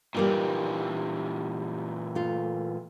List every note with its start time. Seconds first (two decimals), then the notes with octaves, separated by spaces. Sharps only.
0.15 A#2 E3 G3 A#3 D#4
2.15 A3 F4